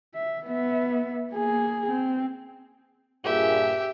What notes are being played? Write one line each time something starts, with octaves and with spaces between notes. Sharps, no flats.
E5
B3 E5
A#3 G#4
C4
G2 A#2 G4 G#4 E5